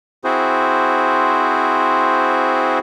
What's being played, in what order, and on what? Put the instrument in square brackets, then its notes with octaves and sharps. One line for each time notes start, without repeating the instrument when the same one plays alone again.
[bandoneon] C4 E4 F#4 G#4 C5